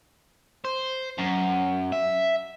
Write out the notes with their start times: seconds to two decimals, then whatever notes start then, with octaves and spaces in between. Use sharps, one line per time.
0.65 C5
1.18 F#2
1.92 E5